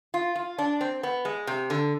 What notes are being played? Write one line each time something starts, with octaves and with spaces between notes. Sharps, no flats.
F4
F4
D4
C4
B3
G#3
C3
D3